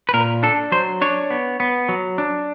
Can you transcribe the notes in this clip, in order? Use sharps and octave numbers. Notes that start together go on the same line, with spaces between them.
B4
A#2 A#4
D4 A4
F#3 C5
D4 C#5
B3
B3
F#3
D4